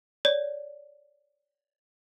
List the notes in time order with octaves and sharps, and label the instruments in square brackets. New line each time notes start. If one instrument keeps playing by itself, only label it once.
[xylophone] C#5 D5